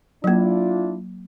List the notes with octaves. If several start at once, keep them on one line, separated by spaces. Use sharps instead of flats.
F#3 A#3 D4 E4 F4